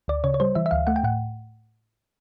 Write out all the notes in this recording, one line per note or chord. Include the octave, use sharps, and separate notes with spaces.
D2 D5
C#3 C#5
C#5
G3 C5
E3 E5
E5
D2 F5
A3 F#5
G5
A2 F#5